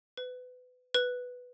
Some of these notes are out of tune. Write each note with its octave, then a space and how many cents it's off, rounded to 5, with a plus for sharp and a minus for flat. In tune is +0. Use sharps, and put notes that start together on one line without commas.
B4 +25
B4 +0